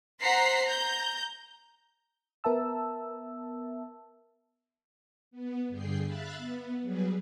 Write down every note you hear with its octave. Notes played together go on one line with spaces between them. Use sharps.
C5 F#5 A#5 B6 C7
A#5 G6
B3 A#4 E5 A5 E6
B3
G2 D3 G#4 G5 C7
E5 F5 B5 F#6 A6
B3
F#3 G3 G#4 B4